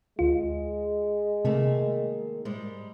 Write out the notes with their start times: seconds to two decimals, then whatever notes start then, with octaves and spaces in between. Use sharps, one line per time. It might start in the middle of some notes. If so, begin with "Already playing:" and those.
0.19 D2 G#3 F4
1.45 C3 D#3 A3 A#3
2.45 G#2 G3 G#3